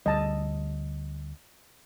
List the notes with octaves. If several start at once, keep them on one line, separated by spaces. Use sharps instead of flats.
D2 G3 D#5 A5